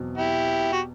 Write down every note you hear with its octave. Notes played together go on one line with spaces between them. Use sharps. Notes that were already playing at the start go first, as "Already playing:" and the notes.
Already playing: E2 B2 F#3 C4
E4 G4
F#4